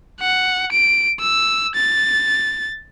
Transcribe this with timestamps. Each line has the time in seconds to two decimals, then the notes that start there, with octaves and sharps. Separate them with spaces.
0.20 F#5
0.72 D7
1.20 E6
1.75 A6